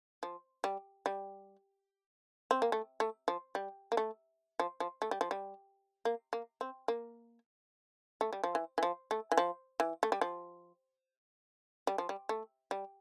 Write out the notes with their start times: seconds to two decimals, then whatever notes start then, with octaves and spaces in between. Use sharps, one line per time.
0.23 F3
0.64 G3
1.06 G3
2.51 C4
2.62 A#3
2.72 A3
3.00 A3
3.28 F3
3.55 G3
3.92 A#3
3.97 A3
4.60 F3
4.80 F3
5.02 A3
5.11 G3
5.21 F3
5.31 G3
6.05 A#3
6.33 A#3
6.61 C4
6.88 A#3
8.21 A3
8.33 G3
8.44 F3
8.55 E3
8.78 E3
8.83 F3
9.11 A3
9.32 E3
9.37 F3
9.80 E3
10.03 A3
10.12 G3
10.21 F3
11.87 G3
11.98 F3
12.09 G3
12.29 A3
12.71 G3